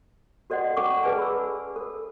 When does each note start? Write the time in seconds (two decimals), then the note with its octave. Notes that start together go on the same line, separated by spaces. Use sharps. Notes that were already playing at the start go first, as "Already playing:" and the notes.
0.50 F#4 A4 D5 D#5 F#5
0.77 C#4 A4 F#5 C#6 D6
1.03 G#4 B4 D5 G#5 A5
1.19 B5 E6
1.76 A4